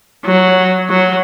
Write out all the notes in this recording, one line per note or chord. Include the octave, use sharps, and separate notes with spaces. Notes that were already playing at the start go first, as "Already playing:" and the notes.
F#3
F#3